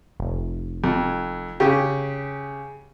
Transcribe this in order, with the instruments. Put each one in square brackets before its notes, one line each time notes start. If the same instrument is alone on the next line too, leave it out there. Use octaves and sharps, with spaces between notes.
[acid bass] F1
[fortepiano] F2
C#3 G4